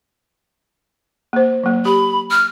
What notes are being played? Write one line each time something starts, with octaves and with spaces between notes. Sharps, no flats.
A#3 C5
F#3 A#3
G4 B5
F6